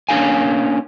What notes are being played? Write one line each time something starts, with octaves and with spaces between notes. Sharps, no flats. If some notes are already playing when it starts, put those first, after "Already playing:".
A#3 C#4 D4 G4 F5 G#5